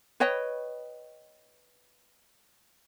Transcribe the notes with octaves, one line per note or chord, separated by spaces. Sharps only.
B4 C#5 D#5 G5